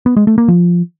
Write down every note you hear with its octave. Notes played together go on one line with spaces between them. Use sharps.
B3
G#3
A3
A#3
F3